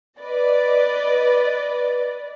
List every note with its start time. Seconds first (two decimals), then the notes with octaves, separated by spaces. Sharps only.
0.19 B4 D5 D#5